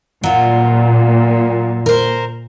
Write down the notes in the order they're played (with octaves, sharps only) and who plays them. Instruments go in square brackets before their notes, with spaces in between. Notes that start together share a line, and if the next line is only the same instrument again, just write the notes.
[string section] A#2 [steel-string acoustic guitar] F#3 F4
[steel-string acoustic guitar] A#4 C5